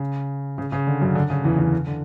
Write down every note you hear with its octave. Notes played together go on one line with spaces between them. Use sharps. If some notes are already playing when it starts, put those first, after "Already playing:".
Already playing: C#3
C#3
C#3
D3
F#2 F#3
D3
C#3
E2 E3
E2 E3
D3